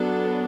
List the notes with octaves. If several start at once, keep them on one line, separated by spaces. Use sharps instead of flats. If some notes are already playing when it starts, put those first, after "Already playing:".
Already playing: F#3 B3 D4 A4